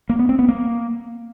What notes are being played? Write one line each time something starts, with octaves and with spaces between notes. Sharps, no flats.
A#3
B3
C4
B3
A#3